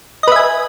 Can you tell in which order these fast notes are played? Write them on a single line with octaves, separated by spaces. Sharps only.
D#5 B4 E5 G#5